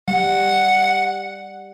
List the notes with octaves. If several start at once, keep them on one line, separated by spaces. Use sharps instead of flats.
G3 F#5